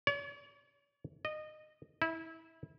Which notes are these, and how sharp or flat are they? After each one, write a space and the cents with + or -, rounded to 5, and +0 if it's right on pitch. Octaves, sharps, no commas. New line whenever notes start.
C#5 +45
D#5 -20
E4 -25